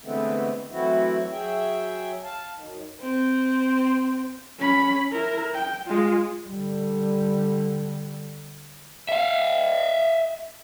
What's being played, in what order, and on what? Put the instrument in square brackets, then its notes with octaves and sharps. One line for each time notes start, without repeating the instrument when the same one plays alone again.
[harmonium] D3 E3 G#3 A3 B3 C4
E3 F#3 A3 C4 E4 F#4
F#3 G#4 E5 G5
F5 A5
F#2 D#3
[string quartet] C4
[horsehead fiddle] C#4 B5
E4 A#4
G5
G#3 F4
[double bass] D3 G3
[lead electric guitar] E5 F5